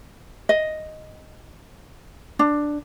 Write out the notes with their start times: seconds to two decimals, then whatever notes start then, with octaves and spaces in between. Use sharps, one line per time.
0.49 D#5
2.39 D4